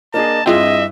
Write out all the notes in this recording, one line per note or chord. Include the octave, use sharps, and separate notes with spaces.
A#3 D4 G#4 D#5 A5
G2 C4 E4 F4 G#4 D#5 E5